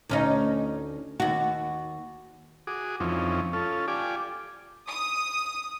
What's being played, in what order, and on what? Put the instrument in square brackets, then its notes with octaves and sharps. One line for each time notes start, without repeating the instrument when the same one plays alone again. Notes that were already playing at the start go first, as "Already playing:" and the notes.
[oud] D2 C#4 D#4
D#2 F#4
[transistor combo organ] F#4 G#4 D6 D#6
F2 E3 F3 C4 C#4 D#4
C#4 F4 A4
F4 G4 D5 G#5 D6
[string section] D#6